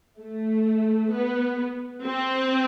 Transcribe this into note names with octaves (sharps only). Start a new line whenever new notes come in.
A3
B3
C4